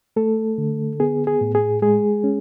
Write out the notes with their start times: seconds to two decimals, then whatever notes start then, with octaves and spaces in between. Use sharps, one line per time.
0.16 A3 A4
0.58 D3
1.00 B3 G#4
1.27 G#4
1.41 A2
1.55 G#4
1.82 G#3 G#4
2.24 C#4